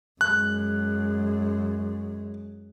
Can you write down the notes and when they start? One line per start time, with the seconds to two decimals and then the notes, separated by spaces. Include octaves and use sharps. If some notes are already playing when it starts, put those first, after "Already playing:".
0.21 F#2 G#3 F#6